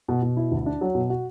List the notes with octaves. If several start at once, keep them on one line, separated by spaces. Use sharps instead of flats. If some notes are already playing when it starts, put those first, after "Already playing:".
B2
B2
E4
D2
D4
F#3
B2
F#4